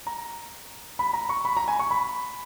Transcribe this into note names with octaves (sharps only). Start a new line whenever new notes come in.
A#5
B5
A#5
C#6
B5
A#5
G#5
C#6
B5